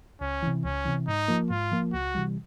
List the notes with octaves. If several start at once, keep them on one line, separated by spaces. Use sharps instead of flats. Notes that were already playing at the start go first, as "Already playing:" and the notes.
C#2 C#4
C3 E3
C#2 C#4
C3 E3
G#2 D#4
F3 A#3
G#2 F4
F3 A#3
C#2 F#4
C3 E3 G3